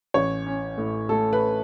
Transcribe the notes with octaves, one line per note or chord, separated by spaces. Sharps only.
A1 C#5
C#4
A2
A3 A4
B4